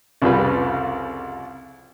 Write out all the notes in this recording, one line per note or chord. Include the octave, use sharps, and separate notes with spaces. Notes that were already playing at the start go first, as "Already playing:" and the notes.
C2 F2 C#3 G3 B4 B5